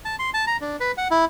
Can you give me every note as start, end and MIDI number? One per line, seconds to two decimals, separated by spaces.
0.05 0.16 81
0.19 0.30 84
0.34 0.45 81
0.47 0.57 82
0.61 0.76 62
0.80 0.92 71
0.98 1.08 78
1.11 1.25 64